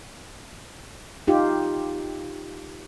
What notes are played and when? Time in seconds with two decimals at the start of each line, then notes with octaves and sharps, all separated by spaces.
1.27 D#4 F4 G4